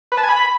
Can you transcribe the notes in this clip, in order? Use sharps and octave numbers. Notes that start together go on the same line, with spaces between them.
B4
A5
G#5
B5